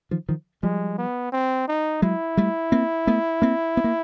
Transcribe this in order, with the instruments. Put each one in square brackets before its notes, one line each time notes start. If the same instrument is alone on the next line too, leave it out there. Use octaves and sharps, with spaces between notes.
[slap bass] D#3 F3
D#3 F3
[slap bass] F3 G3 [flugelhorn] G#3
[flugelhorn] B3
C4
D#4
[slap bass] F#3 G#3 [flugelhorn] E4
[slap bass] G3 A3
A#3 C4
A3 B3
A#3 C4
B3
A#3